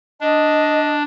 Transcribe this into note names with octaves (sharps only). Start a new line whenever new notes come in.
D4 D#5